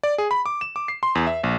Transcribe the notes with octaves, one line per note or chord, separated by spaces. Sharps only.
D5
G#4
B5
D6
E7
D6
C7
C6
E2
E5
A#1